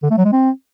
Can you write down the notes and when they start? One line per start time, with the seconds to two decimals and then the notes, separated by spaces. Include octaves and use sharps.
0.03 D3
0.11 A3
0.18 F#3
0.25 G#3
0.33 C4